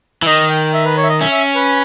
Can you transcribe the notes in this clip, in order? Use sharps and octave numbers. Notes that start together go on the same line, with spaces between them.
E3
D#3 D#5
G5
E5
B4
C#5
E5
D#5
C#4 E5
E5
B4